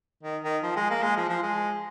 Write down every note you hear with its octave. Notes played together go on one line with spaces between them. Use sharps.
D#3
D#3
F3
G#3
A#3
G#3
F3
F3
G#3